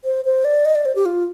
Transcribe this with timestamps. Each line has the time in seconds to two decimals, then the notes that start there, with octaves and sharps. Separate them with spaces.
0.04 C5
0.25 C5
0.45 D5
0.65 D#5
0.75 D5
0.85 C5
0.95 G4
1.05 F4